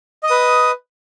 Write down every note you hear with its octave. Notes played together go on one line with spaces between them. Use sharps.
B4 D#5 D#6